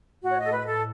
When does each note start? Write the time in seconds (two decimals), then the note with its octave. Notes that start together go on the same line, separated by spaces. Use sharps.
0.23 A2 F#4
0.32 C#5
0.38 D#5
0.45 A4
0.51 A2 B4
0.66 A4